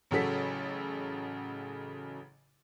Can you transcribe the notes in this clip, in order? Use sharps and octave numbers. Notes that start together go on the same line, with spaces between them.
A1 C#3 F#3 A4 B6